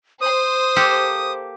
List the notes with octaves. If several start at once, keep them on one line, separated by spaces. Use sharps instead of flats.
C5 D#6
A#3 G4 A4